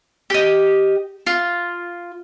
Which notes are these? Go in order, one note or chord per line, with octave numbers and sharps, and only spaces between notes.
G4 D#5
F4